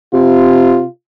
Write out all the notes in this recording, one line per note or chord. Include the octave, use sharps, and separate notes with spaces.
C3 F4